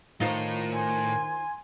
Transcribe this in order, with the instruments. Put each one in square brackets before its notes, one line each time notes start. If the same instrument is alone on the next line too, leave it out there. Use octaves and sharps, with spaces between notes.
[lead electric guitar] A2 [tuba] D#3 [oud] D#4 F4 C5
[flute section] G#5 C6